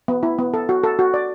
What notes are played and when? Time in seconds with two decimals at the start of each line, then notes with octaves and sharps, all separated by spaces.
0.08 B3
0.23 E4
0.39 B3
0.54 A4
0.69 F#4
0.83 A4
0.99 F#4
1.14 D5